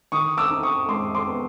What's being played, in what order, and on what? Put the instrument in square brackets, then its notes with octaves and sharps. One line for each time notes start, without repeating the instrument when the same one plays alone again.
[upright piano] D#3 C#6 D#6
D6 E6
D#4
C#6 D#6
G#3 C6 D6
C6 D6
B3